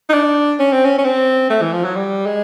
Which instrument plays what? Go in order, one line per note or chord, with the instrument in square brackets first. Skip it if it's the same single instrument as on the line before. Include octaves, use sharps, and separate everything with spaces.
[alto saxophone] D#4
D4
C#4
C4
C#4
C#4
C4
A3
E3
F3
F#3
G3
G#3